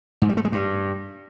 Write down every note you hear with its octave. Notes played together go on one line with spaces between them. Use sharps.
G#2
G3
A3
G#3
G2